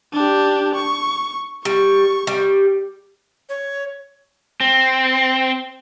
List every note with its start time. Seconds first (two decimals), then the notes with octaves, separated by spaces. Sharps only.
0.13 D4 G4
0.75 C#6
1.65 G3 C#6
2.27 G3
3.49 C#5
4.60 C4